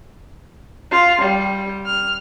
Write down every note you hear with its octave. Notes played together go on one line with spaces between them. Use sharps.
F4
G3
F6